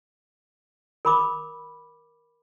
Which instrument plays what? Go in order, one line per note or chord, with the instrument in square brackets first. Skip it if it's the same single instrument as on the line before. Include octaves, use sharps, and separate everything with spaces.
[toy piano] A#4 B5 D6